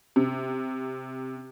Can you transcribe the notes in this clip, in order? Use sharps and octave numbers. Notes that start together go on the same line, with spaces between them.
C3